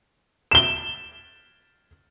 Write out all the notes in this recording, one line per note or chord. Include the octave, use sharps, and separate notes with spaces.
E7 G7